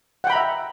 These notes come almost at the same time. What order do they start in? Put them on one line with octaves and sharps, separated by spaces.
F#5 G5 B5 A#5 E5